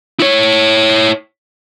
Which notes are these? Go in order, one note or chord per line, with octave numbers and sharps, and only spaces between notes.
E4 C#5